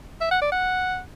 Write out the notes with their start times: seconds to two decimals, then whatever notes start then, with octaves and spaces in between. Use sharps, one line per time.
0.21 E5
0.31 F#5
0.42 D5
0.52 F#5